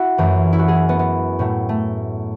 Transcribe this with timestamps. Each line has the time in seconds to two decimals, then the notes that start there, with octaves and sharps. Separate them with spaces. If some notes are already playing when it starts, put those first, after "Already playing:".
Already playing: E4 F#4
0.18 F#2 E3 A3
0.53 E4
0.59 F#4
0.68 G#4
0.89 B3
0.99 B3
1.39 A2 F#3 A3
1.69 A3